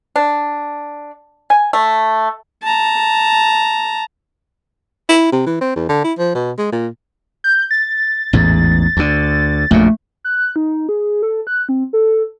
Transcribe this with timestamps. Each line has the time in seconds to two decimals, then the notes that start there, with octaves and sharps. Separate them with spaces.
0.16 D4
1.50 G#5
1.73 A3
2.63 A5 A#5
5.09 E4
5.32 C3
5.46 E3
5.61 C4
5.76 E2
5.89 D3
6.04 E4
6.18 F3
6.35 B2
6.58 G#3
6.72 A#2
7.44 G6
7.71 A6
8.33 A1 E2 G#2
8.97 D2 D3
9.71 A#1 F#2 A#2 A3
10.24 F#6
10.56 D#4
10.89 G#4
11.22 A4
11.47 F#6
11.69 C4
11.93 A4